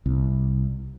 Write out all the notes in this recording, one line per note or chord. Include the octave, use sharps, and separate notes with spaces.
C2